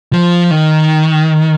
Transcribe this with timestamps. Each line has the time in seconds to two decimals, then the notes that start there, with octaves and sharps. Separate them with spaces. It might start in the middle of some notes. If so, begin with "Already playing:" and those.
0.13 F3
0.51 D#3